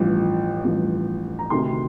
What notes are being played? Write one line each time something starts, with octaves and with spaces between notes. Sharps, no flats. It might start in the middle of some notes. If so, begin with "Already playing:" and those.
Already playing: A1 G2 F3
A1 G2 F3
A#5
D2 C3 D#3 C6